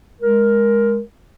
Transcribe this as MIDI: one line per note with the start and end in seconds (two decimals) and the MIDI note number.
0.20 1.00 56
0.20 1.00 70